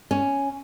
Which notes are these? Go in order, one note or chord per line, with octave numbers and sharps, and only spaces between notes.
C#4